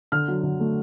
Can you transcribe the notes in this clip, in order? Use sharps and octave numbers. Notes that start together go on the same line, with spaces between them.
D3 F6
F#3
D3
A3